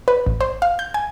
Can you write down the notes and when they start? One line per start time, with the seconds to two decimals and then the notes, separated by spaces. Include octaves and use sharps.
0.08 B4
0.26 A1
0.41 C5
0.62 F5
0.79 G6
0.94 G#5